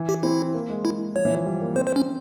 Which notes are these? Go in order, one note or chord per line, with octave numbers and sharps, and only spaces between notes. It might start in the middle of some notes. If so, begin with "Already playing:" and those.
Already playing: E3
G4
C4 E4
A#3
G#3
E4
F3 C#5
E3
F3
G3
A#3
C4 C5
C5
C#4